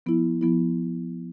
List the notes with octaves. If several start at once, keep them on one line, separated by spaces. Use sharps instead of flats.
F3 B3 E4
F3 B3 E4